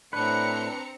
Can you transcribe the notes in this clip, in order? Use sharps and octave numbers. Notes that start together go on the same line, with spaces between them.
A2 C4 D4 B4 A#5 C#7